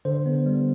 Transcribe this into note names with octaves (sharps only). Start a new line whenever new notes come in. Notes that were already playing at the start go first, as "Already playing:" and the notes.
D3 C5
B3
G3